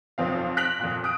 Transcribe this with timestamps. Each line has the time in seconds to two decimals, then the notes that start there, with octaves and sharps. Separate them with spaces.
0.18 B1 F2 F3 C4 F5
0.57 F#6 A#6 B6 D7 F7 F#7
0.80 F2 A#2
1.04 D#6 F#6 D7